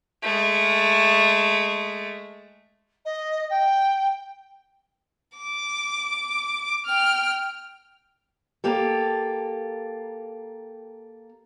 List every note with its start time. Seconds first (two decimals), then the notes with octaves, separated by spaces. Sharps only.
0.23 G#3 A3
3.05 D#5
3.50 G5
5.38 D6
6.86 G5 F6
8.64 A#3 G4 A4